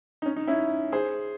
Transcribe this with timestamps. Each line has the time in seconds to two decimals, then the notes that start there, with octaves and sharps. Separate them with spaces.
0.22 D#4
0.26 C#4
0.36 D#4
0.47 C#4 E4
0.92 G#4 C5